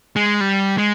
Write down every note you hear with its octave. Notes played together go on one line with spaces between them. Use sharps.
G#3
G3
G#3